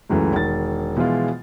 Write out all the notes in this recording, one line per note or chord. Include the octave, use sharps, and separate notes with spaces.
C#2 F#2 E3 A3
E1 D#3 A6
B2 E3 F3 G#3 F4